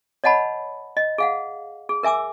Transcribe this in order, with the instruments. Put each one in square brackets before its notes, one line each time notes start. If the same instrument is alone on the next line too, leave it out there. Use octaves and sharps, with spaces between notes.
[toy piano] C#5 D#5 F#5 A5 B5
D#5
G#4 F5 F#5
G#4
A#4 E5 G#5 D6 E6